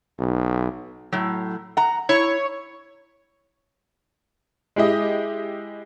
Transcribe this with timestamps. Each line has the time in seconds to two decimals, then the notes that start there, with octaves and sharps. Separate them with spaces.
0.19 B1
1.12 A2 F#3
1.77 F#5 A#5
2.09 E4 C#5
4.76 G#3 E4 G4 D#5